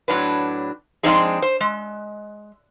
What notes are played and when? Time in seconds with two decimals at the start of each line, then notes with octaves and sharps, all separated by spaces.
0.08 A2 F#3 D4 B4
1.03 F3 G#3 C4 D4 D#4 G#4
1.42 C5
1.61 G#3